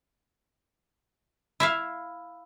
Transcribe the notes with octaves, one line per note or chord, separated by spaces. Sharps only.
E4 E5 F5